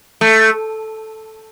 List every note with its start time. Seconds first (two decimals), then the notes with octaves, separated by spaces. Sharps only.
0.21 A3